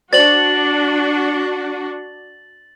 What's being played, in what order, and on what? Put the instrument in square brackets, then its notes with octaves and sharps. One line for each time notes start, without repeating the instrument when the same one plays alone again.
[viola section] D4 F#4 [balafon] C5 D5 [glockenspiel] A6 F#7